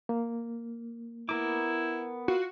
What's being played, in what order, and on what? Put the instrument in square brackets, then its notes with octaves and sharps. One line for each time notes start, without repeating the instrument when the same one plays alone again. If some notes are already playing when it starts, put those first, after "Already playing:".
[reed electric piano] A#3
[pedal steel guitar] B3 A#4 D6 [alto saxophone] E4
[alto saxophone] F4 [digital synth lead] F#4